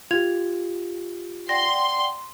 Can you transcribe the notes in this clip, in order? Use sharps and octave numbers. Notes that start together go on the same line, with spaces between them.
F4 G4 G#6 F7
D5 F#5 G5 C6 A#6